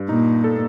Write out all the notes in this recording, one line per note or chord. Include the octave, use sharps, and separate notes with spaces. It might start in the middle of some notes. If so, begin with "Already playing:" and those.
Already playing: G2
A#2 D#4
A4